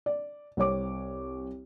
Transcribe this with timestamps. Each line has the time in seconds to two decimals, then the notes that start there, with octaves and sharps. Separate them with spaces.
0.06 D5
0.57 C2 C4 C#5 D6